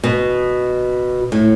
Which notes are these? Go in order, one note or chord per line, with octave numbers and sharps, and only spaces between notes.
B2
A2